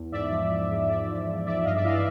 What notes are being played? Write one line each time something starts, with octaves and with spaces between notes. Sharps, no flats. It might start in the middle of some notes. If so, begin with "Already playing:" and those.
Already playing: E2
G#2 D5 E5
F3
F3
G#2
G#2 D5 E5
F3
F3
G#2 D5 E5
G2 D#5 F5
D5 E5
E3 D#5 F5
D5 E5